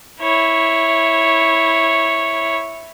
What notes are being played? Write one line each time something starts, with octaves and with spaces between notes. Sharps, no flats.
E4 C#5